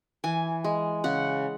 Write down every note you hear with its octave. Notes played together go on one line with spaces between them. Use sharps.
E3 G#5
G#3
C#3 F#5